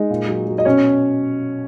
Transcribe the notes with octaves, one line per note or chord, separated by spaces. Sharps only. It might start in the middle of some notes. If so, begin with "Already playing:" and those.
Already playing: G#3 D#4 D#5
A#2
F#3
F#3
D#5
B2 C#4 C#5